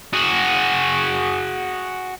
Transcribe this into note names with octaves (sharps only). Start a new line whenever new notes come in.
F#4 G#4